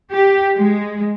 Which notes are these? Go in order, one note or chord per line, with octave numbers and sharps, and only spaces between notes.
G4
G#3